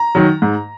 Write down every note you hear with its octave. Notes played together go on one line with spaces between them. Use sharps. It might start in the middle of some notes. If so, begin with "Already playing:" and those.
Already playing: A#5
D#3 F#3
G#2